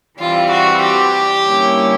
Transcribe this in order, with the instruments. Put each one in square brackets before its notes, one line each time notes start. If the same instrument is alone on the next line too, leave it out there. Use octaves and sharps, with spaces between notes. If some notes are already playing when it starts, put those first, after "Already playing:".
[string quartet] E3 G3 C4 [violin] F4
[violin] F#4
G4
[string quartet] D3 G3 A#3 C#4 E4